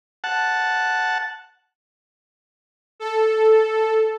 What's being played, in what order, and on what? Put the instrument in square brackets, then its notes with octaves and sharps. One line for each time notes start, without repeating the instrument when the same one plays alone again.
[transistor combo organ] F#5 A5
[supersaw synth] A4